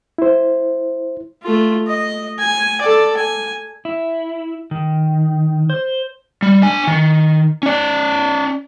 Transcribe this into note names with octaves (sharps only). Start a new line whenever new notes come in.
E4 C5
A3 F4
D#5
G#5
A4 D5
G#5
E4
D#3
C5
G3
D4 G#5
D#3
C#4 D5